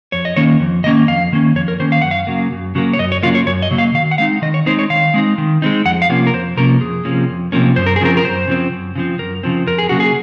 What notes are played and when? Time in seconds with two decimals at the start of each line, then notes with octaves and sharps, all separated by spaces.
0.12 F2 C#5
0.25 D#5
0.36 D#3 A#3 C#4 C#5
0.60 F2
0.84 D#3 A#3 C#4 D#5
1.08 F2 F5
1.32 D#3 A#3 C#4
1.56 F2 C#5
1.68 A#4
1.80 D#3 A#3 C#4 C5
1.92 F5
2.02 F#2 F#5
2.11 F5
2.27 C#3 F#3 A#3
2.52 F#2
2.75 C#3 F#3 A#3
2.93 C#5
2.99 F#2 D#5
3.12 C#5
3.23 C#3 F#3 A#3 F4
3.35 C#5
3.46 F#2 C#5
3.62 D#5
3.71 C#3 F#3 A#3
3.78 F5
3.94 D#3 F5
4.11 F#5
4.18 G#3 C4 D#4 F5
4.42 D#3 D#5
4.54 C#5
4.66 G#3 C4 D#4 C5
4.79 C#5
4.90 D#3 F5
5.14 G#3 C4 D#4
5.38 D#3
5.62 G#3 C4 D#4
5.85 F2 F#5
6.02 F5
6.10 C3 F3 A#3 C#4
6.27 A#4
6.34 F2 C5
6.57 C3 F3 A#3 C#4 A#4
6.81 F2 G#4
7.05 C3 F3 A#3 C#4
7.28 F2
7.52 C3 F3 A#3 C#4
7.76 F#2 C5
7.86 A#4
7.96 G#4
8.01 C#3 F3 C4 A#4
8.17 A#4
8.25 F#2 C5
8.48 C#3 F3 C4
8.71 F#2
8.95 C#3 F3 C4
9.19 F#2 A#4
9.43 C#3 F3 C4
9.67 F2 A#4
9.78 G#4
9.89 C#3 F#3 A#3 F#4
10.00 G#4